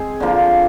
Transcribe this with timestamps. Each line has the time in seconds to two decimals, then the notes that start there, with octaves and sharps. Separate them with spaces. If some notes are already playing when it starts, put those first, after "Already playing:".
Already playing: G#3 C4 G#4
0.20 D3 F3 A#3